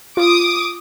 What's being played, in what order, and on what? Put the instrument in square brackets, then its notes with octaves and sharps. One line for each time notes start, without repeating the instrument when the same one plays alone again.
[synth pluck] F4 [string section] D6 D#6